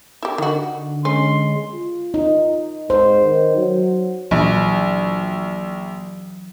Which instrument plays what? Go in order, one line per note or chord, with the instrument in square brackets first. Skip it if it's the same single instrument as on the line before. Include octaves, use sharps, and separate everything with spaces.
[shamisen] E4 G4
[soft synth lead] D3 [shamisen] D#3 F#4
[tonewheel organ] G#3 [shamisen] C#4 [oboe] C6
[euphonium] F4
[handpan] D#4
[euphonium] G#2 [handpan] C5
[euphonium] D#3
F#3
[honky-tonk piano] A#1 [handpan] E3 F#3